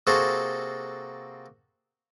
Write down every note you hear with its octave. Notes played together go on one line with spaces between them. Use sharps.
C3 A#3 F#4 G#4 A4 C5